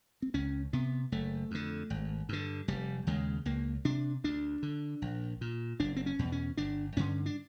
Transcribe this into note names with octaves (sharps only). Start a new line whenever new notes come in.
C4
C#2 C#4
C3 B3
F#1 A3
F2 D3
G#1
G2 D3
F1 G3
D#2 C#3 G#3
C#2 A#3
C3 D4
D2 D4
D3
A#1
A#2
F#1 D4
C4
C#4
E2 B2
C#4
G1 D4
G2 D3 C#4
D4